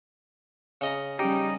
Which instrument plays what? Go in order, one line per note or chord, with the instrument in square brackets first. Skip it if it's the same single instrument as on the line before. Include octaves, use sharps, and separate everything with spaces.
[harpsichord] C#3 D#5 A#5
[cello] G3 C#4 [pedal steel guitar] D#4 [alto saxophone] G4